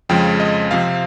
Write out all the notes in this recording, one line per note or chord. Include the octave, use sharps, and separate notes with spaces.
F2 C#3 F3 G#3 G5
D#5
C3 F3 C4 F5